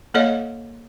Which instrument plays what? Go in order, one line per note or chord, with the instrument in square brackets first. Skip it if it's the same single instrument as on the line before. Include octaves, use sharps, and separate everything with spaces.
[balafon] A#3 A4 C#5 D#5 F5